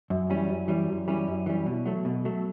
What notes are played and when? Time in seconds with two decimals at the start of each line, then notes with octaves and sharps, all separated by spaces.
0.10 F#2
0.30 E3 G3 C#4
0.49 F#2
0.68 E3 G3 C#4
0.88 F#2
1.08 E3 G3 C#4
1.27 F#2
1.46 E3 G3 C#4
1.66 B2
1.86 F#3 A3
2.05 B2
2.25 F#3 A3